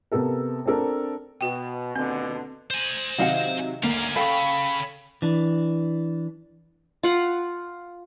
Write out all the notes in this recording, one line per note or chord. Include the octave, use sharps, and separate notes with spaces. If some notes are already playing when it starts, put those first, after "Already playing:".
C3 B3 A4 A#4
C4 D4 A4 A#4
B2 F#4 G5
D#2 B2 D3 C4
C5 G#5
C3 D#3 F#3 D#5 F5 F#5
D2 A#3 C#4 A#4 C7
C#3 A4 F5 G5 A5 B5 C#6
E3 D4
F4 F#5